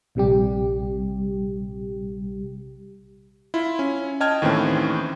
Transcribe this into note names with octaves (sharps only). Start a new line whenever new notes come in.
A#1 C3 G3 G4
E4 F4
C#4
D#5 G5 A5 F6 G#6
D#2 A2 D#3 E3 C4 C#4